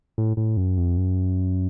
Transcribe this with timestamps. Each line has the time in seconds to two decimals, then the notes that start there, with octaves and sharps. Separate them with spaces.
0.18 A2
0.37 A2
0.57 F#2
0.77 F2
0.97 F#2